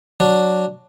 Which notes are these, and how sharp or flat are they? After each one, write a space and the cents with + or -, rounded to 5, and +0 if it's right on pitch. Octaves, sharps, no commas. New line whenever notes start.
F#3 -5 D4 +0